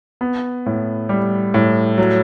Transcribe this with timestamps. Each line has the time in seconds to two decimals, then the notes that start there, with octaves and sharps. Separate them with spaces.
0.21 B3
0.66 A2
1.09 G3
1.54 A2
1.98 F#3